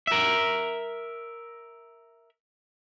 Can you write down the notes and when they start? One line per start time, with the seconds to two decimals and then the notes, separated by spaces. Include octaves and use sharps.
0.07 A#4 E5